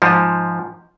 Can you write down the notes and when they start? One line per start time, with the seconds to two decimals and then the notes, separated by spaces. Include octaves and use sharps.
0.02 G#2 F3